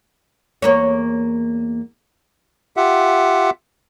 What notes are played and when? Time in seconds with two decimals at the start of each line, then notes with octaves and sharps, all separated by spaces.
0.62 E2 A#3 C#5
2.77 F4 G4 E5 F#5